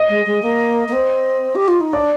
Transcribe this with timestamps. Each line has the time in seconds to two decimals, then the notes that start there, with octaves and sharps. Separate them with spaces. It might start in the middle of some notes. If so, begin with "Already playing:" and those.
Already playing: D#5
0.09 G#3
0.26 G#3
0.42 A#3
0.88 A#3
0.93 C4
1.55 G4
1.68 F4
1.80 D#4
1.93 D4 D5